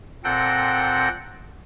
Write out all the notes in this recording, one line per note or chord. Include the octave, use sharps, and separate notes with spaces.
A#2 C4 A4 F#5 G5 A#6